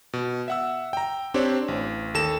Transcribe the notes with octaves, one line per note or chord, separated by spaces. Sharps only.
B2
E5 F#5 E6
G5 A#5
C4 D4 G4 C5 C#5
A1
D#2 A4 A#6 E7